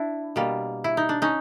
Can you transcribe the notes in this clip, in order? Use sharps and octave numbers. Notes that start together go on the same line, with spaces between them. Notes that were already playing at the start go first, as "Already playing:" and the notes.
Already playing: D4 E4
B2 G3 A#3
E4
D#4
D4
C#4 D#4